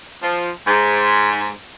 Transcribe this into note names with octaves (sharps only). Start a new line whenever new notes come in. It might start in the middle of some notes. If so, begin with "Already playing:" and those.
F3
G#2